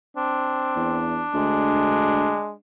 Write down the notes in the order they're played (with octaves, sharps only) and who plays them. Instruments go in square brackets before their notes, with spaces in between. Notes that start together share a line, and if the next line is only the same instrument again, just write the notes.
[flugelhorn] C4 [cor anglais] D4
[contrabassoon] E2
[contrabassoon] D2 [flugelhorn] G#3